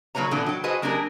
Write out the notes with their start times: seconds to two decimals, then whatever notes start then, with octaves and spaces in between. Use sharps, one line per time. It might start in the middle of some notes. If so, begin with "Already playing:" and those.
0.15 D3 F#3 A#3 B4 C#5 A#5
0.31 A#2 D3 E3 B3 D4 F#4
0.46 F#3 G5
0.64 F#4 G#4 B4 C5 D#5
0.82 F#3 A#3 D4 G4 G#4 A#4